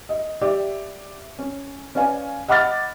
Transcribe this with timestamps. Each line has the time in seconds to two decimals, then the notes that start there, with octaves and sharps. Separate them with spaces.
0.09 D#5
0.41 G4 D5 E5
1.39 C#4
1.95 C#4 B4 D5 F5 G#5
2.48 D#5 F#5 B5 D6 F6 A6